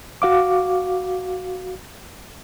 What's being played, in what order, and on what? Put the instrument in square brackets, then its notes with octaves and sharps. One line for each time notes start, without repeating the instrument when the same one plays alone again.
[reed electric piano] F#4 F5 D6